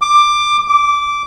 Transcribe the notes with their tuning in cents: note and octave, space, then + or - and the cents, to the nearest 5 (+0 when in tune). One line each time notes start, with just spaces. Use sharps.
D6 +15
D6 -10